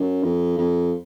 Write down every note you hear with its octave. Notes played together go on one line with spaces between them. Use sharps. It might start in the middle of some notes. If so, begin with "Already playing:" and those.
Already playing: F#2
F2
F2